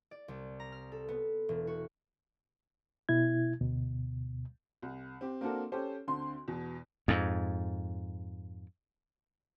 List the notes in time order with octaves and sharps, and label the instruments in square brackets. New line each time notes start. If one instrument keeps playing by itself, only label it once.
[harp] D5
C2
A#5
F6
A4
B3
E1
F#4
[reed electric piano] B2 E4 G#6
D2 B2
[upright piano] C2
C4 G4
A#3 C4 D4 F#4 A4 A#4
C#4 G4 A4 C5
D2 D3 C4 C6
E2 B2
[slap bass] F2 G#2